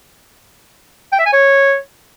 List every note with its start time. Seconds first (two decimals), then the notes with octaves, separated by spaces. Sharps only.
1.12 G5
1.19 E5
1.26 G#5
1.33 C#5